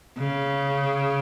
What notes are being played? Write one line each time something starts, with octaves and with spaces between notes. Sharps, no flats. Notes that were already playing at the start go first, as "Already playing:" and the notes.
C#3